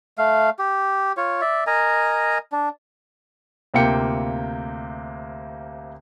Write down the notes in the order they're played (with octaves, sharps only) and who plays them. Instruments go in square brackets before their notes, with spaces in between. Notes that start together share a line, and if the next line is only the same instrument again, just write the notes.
[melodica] A3 F5
G4
F4 C#5
D5 E5
A#4 D#5 G#5 A#5
D4
[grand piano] D2 C3 A#3 F4 G5 C#7